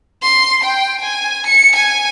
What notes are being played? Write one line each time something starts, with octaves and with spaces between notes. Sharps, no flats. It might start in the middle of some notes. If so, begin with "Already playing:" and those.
C6
G5
G#5
C#7
G#5